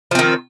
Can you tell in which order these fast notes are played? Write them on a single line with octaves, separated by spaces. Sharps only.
F3 C4 D#3